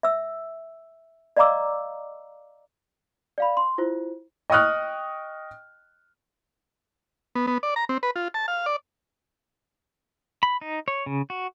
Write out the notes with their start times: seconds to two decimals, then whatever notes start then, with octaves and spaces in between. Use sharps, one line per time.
0.03 E5 E6
1.37 D5 D#5 F5 A#5 D6 E6
3.38 D5 F5 B5
3.57 C6
3.78 E4 F4 C5
4.50 D#5 G5 C#6 D#6 F6 F#6
7.35 B3
7.47 B3
7.63 D5
7.76 A#5
7.89 C4
8.03 B4
8.16 F4
8.34 A5
8.48 F5
8.66 D5
10.43 B5
10.61 D#4
10.88 C#5
11.06 C#3
11.30 F#4